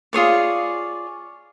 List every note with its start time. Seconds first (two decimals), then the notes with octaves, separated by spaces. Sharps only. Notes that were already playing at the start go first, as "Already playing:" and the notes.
0.13 F4 G#4 C#5 D5